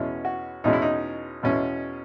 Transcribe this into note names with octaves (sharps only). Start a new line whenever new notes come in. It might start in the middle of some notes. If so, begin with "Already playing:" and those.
Already playing: E2 B2 G#3 C#4
F#4
E2 B2 G#3 C#4 D#4
E4
D#4
E2 B2 G#3 C#4